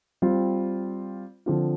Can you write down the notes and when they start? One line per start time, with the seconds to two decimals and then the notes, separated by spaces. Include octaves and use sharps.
0.22 G3 C4 F4
1.46 D3 F3 C4 F4